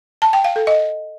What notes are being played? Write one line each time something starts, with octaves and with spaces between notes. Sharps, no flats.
A5
G5
F5
A4
D#5